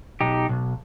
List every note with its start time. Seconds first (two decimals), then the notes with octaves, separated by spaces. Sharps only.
0.21 B1 D#4 G4
0.49 B1